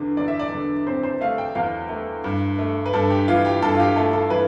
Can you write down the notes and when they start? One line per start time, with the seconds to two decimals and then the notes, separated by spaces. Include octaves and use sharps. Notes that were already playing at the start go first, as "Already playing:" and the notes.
Already playing: E2 D3
0.17 E2 D5
0.28 E5
0.39 D5
0.52 D3
0.87 C4 C5
1.03 C5
1.21 A3 F5
1.38 G5
1.55 E2 F5
1.89 A3
2.24 G2
2.59 A3
2.86 B4
2.93 G2 A4
3.10 G4
3.28 E3 F4
3.45 G4
3.62 G2 A4
3.75 F4
3.80 G4
3.96 A3 A4
4.13 A4
4.30 E3 B4